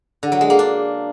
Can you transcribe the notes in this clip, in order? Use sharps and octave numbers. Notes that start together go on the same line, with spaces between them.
D3
F#3
G#3
A#3
D4